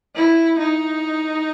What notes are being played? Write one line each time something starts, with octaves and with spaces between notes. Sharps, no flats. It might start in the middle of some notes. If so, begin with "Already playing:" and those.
E4
D#4